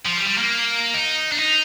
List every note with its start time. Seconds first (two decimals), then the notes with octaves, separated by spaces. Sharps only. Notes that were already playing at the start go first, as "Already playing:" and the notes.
0.05 F3
0.17 G3
0.27 G3
0.38 A#3
0.94 D#4
1.32 D4
1.39 D#4